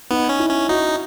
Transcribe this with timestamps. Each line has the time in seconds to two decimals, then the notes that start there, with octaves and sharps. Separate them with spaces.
0.11 B3 D#4
0.29 C#4
0.39 E4
0.49 C#4
0.69 D#4 F#4